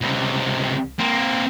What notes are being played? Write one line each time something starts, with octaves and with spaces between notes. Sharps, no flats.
C#2 C3
A#3 C4